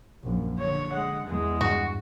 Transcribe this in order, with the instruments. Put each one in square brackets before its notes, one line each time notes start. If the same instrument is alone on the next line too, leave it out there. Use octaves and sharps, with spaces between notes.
[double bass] A#1 F#2
[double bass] D3 [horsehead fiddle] C#5
[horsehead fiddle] G#3 F#5
[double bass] E2 [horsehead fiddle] G#3
[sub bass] G2 [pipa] F#4